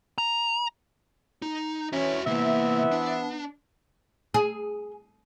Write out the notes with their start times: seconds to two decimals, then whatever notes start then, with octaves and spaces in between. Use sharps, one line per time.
0.18 A#5
1.42 D#4
1.93 E3 C#4 F#4 E5
2.26 C3 E3 A#3 B3 C5 E5
2.92 D4
4.34 G#4